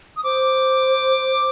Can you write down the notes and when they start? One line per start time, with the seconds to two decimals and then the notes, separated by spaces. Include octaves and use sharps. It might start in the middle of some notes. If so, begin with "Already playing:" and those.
0.17 D#6
0.24 C5 D6